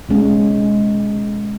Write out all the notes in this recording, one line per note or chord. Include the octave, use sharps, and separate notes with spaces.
B2 G#3 C#4